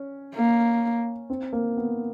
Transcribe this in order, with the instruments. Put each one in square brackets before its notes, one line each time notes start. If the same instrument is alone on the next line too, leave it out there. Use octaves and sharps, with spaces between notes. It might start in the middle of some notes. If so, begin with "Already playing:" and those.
Already playing: [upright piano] C#4
[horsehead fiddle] A#3
[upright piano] C4
A#3
B3